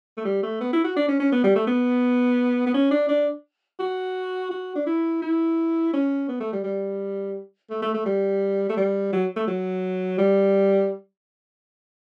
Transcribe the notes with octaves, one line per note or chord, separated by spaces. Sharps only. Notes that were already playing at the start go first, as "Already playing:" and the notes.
A3
G3
A3
B3
E4
F#4
D4
C#4
C#4
B3
G3
A3
B3
B3
C#4
D4
D4
F#4
F#4
D4
E4
E4
C#4
B3
A3
G3
G3
A3
A3
A3
G3
A3
G3
F#3
A3
F#3
G3